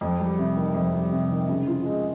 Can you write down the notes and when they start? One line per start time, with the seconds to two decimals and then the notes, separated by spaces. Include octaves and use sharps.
0.01 F2
0.20 G3
0.39 C3
0.57 D#3
0.74 F2
0.93 G3
1.12 C3
1.31 D#3
1.49 C#3
1.68 F4
1.86 G#3